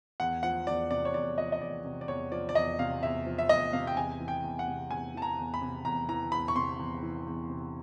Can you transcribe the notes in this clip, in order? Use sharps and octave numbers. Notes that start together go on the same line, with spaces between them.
E2 F#5
F3 F#5
E2 D5
C3 D5
C#5
E2 D5
F3 D#5
D#5
E2 D5
C3
D5
E2 C#5
F3 D5
D5
E2 D#5
C3 F5
E2 E5
F3
E5
E2 D#5
C3 F5
G5
E2 G#5
E3
G5
E2
F#5
C3
E2 G#5
E3 A5
A#5
E2
B5
C3
E2 A#5
E3 A#5
E2 B5
C#6
C3 C6
E2
E3
E2
C3